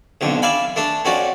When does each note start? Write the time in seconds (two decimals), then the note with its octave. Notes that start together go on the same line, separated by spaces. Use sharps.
0.21 B1 F2 D3
0.42 D5 E5 F5 G#5 B5
0.76 A3 D4 A4
1.05 F2 C#4 F#4 D5